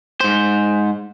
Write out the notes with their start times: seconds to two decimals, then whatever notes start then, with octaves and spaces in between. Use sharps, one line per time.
0.21 G#2 C5